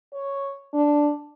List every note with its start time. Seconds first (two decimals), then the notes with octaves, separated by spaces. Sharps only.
0.14 C#5
0.74 D4